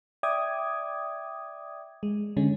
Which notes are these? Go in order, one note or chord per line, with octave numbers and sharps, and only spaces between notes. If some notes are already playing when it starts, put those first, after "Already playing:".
D5 E5 G5 D6 D#6 G#6
G#3
D3 G#3 C#4